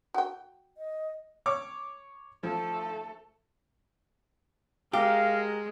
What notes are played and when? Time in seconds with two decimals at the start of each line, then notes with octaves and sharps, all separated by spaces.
0.14 F#4 G5
0.78 D#5
1.46 C#5 D6
2.43 F3 A3 A4
4.93 G#3 G4 A#4 F5